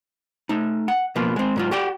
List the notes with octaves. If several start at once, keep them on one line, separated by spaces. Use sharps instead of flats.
A3 D#4
F#5
B2 F3 A#3 B3 F4
G#3 C4
G#2 F#3 F4
F#4 G4 D5 F#5 G5